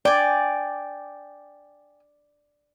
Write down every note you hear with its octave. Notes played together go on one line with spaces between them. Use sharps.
D5 G5 G#5